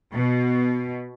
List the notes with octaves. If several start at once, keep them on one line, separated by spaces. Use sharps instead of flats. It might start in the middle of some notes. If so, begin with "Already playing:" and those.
B2